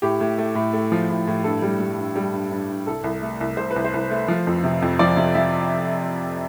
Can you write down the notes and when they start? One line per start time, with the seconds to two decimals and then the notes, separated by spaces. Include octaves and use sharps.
0.02 A2 G4
0.21 A2
0.38 A3
0.55 A2
0.73 A3
0.92 F3
1.09 A2
1.27 A2
1.44 G2 A4
1.62 G3
1.80 G3
1.98 G2
2.15 G3
2.33 G2
2.51 G2
2.69 G2
2.87 C2 A4
3.04 C2
3.22 A3
3.41 C2
3.57 C2 C5
3.71 B4
3.76 C2
3.84 C5
3.94 C2
4.10 A3
4.28 F3
4.47 F2
4.64 C3
4.82 F2
4.99 F3 D5
5.17 C3
5.35 F3 E5